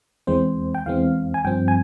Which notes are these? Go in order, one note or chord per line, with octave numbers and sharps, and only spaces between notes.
E2 E3 G#3 C4 C5
G5
E2 E3 G#3 C4 F5
G#5
G2 F3 C4 G5
G#5